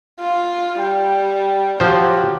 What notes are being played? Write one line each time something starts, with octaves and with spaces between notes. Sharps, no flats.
F4
G3 G5
F3 F#3 G4 C5